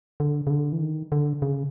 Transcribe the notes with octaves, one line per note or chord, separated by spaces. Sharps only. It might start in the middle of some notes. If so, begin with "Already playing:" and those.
D3
C#3
D3
E3
D#3
D3
C#3